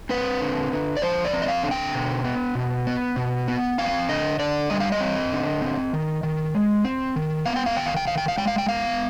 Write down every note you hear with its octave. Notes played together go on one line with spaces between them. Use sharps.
C4 B4
D3
D3
D5
F3 C5
D5
C4
D#5
F5
D3
G5
B2
B3
B2
B3
B2
B3
C4 F5
D3 D#5
D3 D5
G3 D#5
F5
D#5
C4
D3
C4
D#3
D#3
G#3
C4
D#3
B3 F5
G5
F5
D#3 G5
F5
G5
D#3 F5
G5
F5
G#3 G5
F5
G5
B3 F5